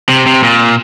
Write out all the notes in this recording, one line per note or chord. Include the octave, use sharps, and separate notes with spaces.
C3
C3
A#2